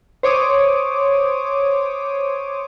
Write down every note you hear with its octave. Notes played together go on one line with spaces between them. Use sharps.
C5 C#5 D6 D#6